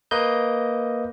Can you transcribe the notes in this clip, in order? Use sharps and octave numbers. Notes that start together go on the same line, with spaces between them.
A#3 B4 D#5 G6